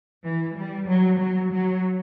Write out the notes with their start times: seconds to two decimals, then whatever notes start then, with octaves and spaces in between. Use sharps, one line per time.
0.24 E3
0.55 G3
0.87 F#3
1.19 F#3
1.52 F#3